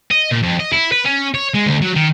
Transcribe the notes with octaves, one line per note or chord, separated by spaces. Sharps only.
D#5
A#2
F2
D#5
E4
B4
C#4
C#5
G#3
D2
F#3
D#3